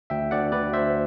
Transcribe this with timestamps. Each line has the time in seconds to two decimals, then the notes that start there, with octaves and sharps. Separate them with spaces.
0.10 D2 E5 G5
0.31 D2 D5 F#5
0.52 D2 B4 D5
0.73 D2 C5 E5